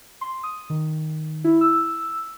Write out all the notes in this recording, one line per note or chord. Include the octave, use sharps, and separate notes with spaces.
C6
D#6
D#3
E4
E6